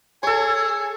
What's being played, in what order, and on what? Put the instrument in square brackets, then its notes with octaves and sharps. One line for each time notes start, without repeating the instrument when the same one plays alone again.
[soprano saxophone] G#4 [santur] A4 C#5